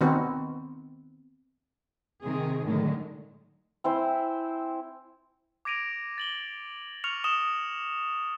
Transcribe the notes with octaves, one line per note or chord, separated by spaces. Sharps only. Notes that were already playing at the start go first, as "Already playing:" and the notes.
D#3 B3 C4 F#4
C3 D#3 C4 G#4
A2 D3 D#3 F#3 G#3
C4 E4 C5 G#5
D6 G#6 A#6 D7 D#7 F7
A6 F#7 G7
C#6 F6 C#7 F7
D#6 E7 G7